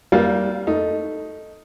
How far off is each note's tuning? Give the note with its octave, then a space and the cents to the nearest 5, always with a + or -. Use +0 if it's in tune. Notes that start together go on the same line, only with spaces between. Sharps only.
G3 -20 A#3 +0 F5 +20
A3 +0 D#4 +0